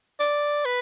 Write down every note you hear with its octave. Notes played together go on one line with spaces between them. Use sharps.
D5
B4